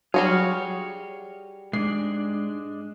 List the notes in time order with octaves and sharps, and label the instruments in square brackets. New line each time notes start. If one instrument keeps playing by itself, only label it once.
[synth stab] F#3 F6 [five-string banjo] G3 F#4 G#4 [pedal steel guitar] C#5 F5
[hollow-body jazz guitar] G#2 [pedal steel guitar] G#3 D4 [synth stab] C7